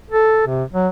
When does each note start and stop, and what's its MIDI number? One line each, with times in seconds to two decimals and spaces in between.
0.11 0.42 69
0.47 0.64 48
0.73 0.88 54